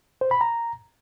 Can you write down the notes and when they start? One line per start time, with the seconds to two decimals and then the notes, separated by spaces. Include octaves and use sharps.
0.21 C5
0.31 B5
0.41 A#5